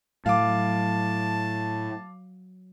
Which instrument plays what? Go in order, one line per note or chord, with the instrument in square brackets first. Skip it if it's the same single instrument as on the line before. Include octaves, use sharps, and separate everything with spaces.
[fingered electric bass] A2 [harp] F#3 [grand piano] F5 D6 [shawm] A5